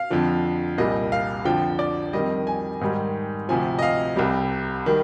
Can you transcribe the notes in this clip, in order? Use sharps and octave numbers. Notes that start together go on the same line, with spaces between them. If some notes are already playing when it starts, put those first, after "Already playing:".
Already playing: F5
F2 D3 F3
C2 A#2 G3 D#5
F5
F2 D3 F3 G5
D5
F2 D#3 G3 D#5
G#5
G#2 D#3 G3
D2 C3 F3 G#5
D#5
F5
C2 C3 G3
D#3 G3